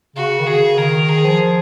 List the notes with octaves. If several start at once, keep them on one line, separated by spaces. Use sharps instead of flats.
C#3 F#4
D#3
C#3 G#4
D#3 A#4
G#4
F3